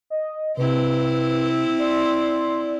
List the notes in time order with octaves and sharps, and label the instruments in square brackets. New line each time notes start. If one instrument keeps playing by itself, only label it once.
[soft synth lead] D#5
[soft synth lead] C3 [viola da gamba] C4 E4 [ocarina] B4
[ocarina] D5 [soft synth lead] C6